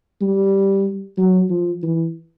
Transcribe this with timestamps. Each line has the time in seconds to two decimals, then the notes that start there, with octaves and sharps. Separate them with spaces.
0.22 G3
1.18 F#3
1.50 F3
1.83 E3